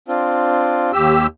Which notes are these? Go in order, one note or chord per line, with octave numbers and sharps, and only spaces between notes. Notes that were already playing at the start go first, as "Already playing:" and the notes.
C4 D4 F4
D#2 G4 E6